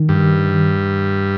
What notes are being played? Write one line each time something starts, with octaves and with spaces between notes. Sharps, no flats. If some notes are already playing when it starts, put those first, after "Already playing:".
Already playing: D#3
G2